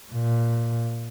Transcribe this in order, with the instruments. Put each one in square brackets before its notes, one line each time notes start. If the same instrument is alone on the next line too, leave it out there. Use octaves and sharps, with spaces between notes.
[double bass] A#2